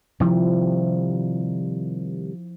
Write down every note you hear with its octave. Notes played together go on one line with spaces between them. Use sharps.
C3 D#3 F3 G3 E4